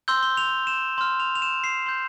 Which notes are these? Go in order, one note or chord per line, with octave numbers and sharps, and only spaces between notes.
C6 E6 G6 G7
G7
F7
E7
C6 F6
F7
F7
E7
C7
C6 G6